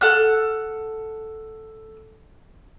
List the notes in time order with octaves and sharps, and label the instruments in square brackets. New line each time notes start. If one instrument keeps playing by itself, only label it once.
[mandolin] A4 F#5 F6 F#6